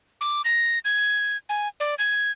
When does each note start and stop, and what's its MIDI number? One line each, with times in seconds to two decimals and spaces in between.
0.21 0.42 86
0.45 0.79 94
0.85 1.37 92
1.49 1.68 80
1.80 1.95 74
1.98 2.31 92